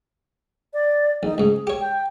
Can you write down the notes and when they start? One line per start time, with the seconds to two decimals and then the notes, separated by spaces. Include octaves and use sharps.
0.74 D5
1.23 A#1 D#4
1.38 C#2 G#2 G#4
1.67 G4 C#5
1.81 G5